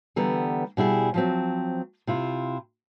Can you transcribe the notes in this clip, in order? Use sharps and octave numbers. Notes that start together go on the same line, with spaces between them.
D3 E3 G3 B3 A#5
B2 G3 E4 G#4
F3 F#3 C4
C3 E4 F4